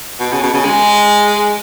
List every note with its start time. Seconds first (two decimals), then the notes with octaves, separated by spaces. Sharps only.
0.20 B2
0.32 C#3
0.43 B2
0.54 C#3
0.65 G#3